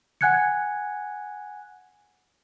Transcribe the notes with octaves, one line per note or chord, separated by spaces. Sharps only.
F#5 G#5 F#6 G#6 C#7